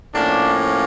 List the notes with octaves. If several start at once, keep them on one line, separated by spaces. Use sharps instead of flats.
A2 F3 A#3 C#4 D4